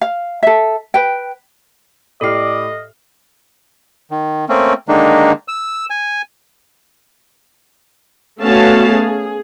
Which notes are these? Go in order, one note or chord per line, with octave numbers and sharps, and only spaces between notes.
F5
A4 E5
B4 G5
A2 G4 A4 D5 D#5 F6 C7
D#3
A3 A#3 C4 C#4
D3 D#3 G#3 A#3 D4 D#4
E6
G#5
A3 B3 C#4 F#4 F5 A5
G#4